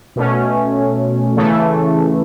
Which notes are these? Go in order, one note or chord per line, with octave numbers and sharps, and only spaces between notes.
B2 A3 C#4
C#3 E3 A3